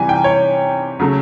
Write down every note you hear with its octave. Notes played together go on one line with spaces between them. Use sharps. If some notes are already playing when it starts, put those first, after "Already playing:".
Already playing: C3 E3 G3 G#5
G5
C#5
C#3 F#3 A3